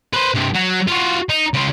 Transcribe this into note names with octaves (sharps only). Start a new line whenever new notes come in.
B4 C5
G2 C3
F#3
F4 F#4
D#4
C#3 F4